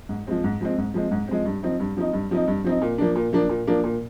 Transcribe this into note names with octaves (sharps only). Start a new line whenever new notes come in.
G#2
F3 G#3 C4
G#2
F3 G#3 C4
G#2
F3 G#3 C4
G#2
F3 G#3 C4
G2
F3 C4 D#4
G2
F3 C4 D#4
G2
F3 C4 D#4
G2
F3 C4 D#4
A#2
F3 A#3 D4
A#2
F3 A#3 D4
A#2
F3 A#3 D4
A#2